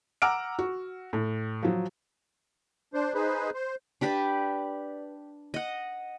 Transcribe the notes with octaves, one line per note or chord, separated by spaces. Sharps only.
F#5 A#5 D6 E6 F6 D7
F#4
A2
F3 F#3
D4 C5
D#4 G#4 B4 C5
C5
D4 G4 B4 D5
D#5 F#5